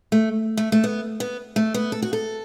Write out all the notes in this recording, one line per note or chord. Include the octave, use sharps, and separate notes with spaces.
A3
A3
A3
B3
B3
A3
B3
A4
F#4
A4